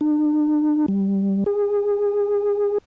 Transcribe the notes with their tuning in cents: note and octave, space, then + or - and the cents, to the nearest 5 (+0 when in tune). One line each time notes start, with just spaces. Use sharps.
D4 +45
G3 +0
G#4 -25